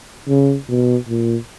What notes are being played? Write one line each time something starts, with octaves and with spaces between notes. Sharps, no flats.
C#3
B2
A#2